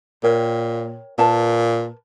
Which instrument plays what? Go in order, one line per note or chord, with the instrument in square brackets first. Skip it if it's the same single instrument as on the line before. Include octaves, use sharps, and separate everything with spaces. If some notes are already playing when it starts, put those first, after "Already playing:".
[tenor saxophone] A#2 [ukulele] A#4 C#5 G5
[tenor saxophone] A#2 [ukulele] A#4 B4 A5